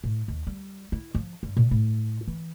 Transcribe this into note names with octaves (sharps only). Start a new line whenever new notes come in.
A2
D#2
G3
E4
F3
G2
A#2
A2
E3